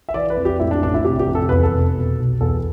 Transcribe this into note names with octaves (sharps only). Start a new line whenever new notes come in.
E5
E3 D5
B4
F2
G4
A2 E4
D4
A1 D4
E4
C3 G4
G4
F2
A4
E2 B4
A4
F1
B2
B1
E2 A4